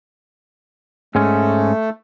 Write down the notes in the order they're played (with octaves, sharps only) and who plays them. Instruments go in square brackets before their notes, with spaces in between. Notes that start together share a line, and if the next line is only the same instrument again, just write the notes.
[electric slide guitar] G#2 G#3 C#4 [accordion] A3